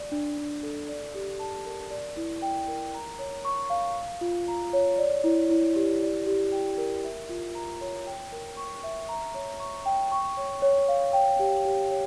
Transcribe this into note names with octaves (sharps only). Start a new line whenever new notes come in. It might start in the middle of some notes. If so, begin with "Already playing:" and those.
Already playing: D5
D4
D4
A4
D5
G4
A5
A#4
D5
E4
G5
A#4
A#5
C#5
C#6
F5
F5
F4
A#5
C#5
D5
E4
E4
G4
D5
G4
G5
A#4
E5
F4
A#5
C#5
G5
A#4
C#6
E5
A#5
C#5
C#6
G5
C#6
C#5
C#5
F5
G5
G4
G4
C#5